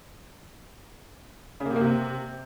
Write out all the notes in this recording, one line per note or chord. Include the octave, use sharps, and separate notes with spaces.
C#3
A#3
C3
A#3
C3